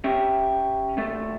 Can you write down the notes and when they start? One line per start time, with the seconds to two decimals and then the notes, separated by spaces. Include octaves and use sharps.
0.04 C#4 G4 E5 G5
0.97 D#2 A3 A4